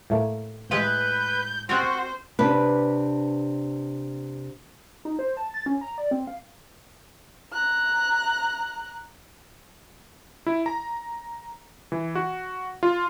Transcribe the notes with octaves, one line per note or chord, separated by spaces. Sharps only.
A2 A3 A#3
A2 G#3 B4 D#5 F5 G6
C4 F4 F#4 A#4 C5
C3 D4 B4
D#4
C5
A5
A6
C#4
A#5
D5
C4
F5
A#5 F#6
E4
A#5
E3
F#4
F4